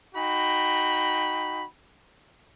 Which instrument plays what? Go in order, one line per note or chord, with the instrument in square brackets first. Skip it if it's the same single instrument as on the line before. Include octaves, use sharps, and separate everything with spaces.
[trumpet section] D#4 F#4 G5 B5